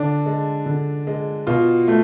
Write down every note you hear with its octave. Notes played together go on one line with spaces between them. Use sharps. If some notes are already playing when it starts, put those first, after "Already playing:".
Already playing: D3 D4
G#3
D3
G#3
B2 F4
A3